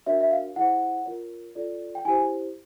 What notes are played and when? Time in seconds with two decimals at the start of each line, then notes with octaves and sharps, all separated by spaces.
0.06 D4 F#4 A#4 C#5 E5
0.21 E5
0.31 F5
0.56 E4 G#4 C5 F#5
1.06 F4 A#4 C#5
1.55 F4 A4 D5
1.95 G5
2.05 E4 G4 C5 G#5